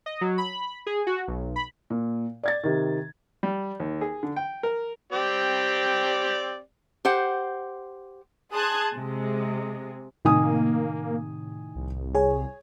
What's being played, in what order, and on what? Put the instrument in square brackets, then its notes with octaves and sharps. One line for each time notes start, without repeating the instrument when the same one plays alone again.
[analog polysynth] D#5
F#3
B5
G#4
F#4
B1
B5
[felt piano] A#2
D5 G#6 A6
C3 D#3
[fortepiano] G3
D#2
G#4
D3
G5
A#4
[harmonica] C4 G4 D5
[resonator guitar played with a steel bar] G4 C5 F#5
[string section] G#4 A5 C6 D#6 F#6 G#6
C3 G#3
[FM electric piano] A2 C3 [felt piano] D#3 G#5 D#6 [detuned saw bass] A#3
[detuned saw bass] C2
[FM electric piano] G#4 C#5 [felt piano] G#5